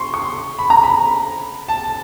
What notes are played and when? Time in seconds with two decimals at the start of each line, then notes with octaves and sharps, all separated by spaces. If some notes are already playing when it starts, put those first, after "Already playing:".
Already playing: C6 C#6
0.14 C#6
0.59 B5
0.70 A#5
0.83 B5
1.69 A5